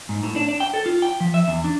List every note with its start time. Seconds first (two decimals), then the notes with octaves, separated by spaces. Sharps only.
0.09 G#2
0.23 A2
0.36 D4
0.48 D4
0.60 G5
0.74 A4
0.86 F4
1.02 G5
1.20 F3
1.34 E5
1.48 E2
1.64 D4